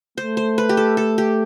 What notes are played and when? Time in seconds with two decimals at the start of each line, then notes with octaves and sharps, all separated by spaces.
0.18 A3 C5
0.37 C5
0.58 B4
0.69 G4
0.77 A4
0.97 A4
1.18 G4